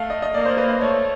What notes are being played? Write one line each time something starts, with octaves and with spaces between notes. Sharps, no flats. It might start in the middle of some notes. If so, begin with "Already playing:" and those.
Already playing: A3 F5
D#5
D#5
A#3 D5
C5
B4
C5
A3 C#5